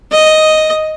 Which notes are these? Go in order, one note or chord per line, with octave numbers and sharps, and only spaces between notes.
D#5